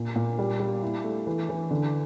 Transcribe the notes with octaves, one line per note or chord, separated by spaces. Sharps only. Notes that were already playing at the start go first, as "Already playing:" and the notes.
Already playing: A#2
A#2
G3
G3
E4
A3
E3
E3
D3